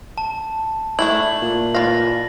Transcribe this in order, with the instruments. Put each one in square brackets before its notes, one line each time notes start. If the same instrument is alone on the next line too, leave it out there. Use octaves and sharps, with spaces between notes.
[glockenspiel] A5
[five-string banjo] A3 D4 E4 [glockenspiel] F#7
[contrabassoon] A#2
[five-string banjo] E3 C4 F5 [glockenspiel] A6 A#6